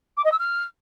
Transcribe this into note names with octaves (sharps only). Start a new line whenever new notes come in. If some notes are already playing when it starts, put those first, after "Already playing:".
D6
D#5
E6
F6